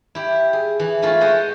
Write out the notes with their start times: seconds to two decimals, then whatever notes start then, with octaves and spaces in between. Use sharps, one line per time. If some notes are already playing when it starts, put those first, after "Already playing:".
0.15 E4 G4
0.53 G#4
0.79 E3
1.02 E3 A3 C#4 E4 F4
1.20 G#3 C5 D#5 F#5 C6